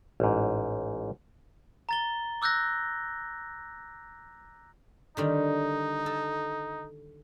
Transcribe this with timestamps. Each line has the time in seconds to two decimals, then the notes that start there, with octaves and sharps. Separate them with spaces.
0.20 A1 G#2
1.89 A#5 A6 G7
2.42 D6 E6 F#6 G6 A#6
5.17 D3 D#3 G3 D#4
6.06 A4